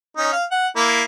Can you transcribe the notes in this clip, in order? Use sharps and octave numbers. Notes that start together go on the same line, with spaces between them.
C#4 D#4
F5
F#5
A#3 E4